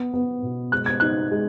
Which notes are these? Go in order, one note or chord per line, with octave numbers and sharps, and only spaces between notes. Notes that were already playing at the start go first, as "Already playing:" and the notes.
Already playing: B3
B3
B2
G#3 F#6
G#6
D#4 F#6
G#3